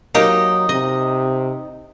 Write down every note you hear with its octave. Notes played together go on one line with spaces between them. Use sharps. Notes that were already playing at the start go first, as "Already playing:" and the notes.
F#3 A#3 D#4 G4
C3 D#5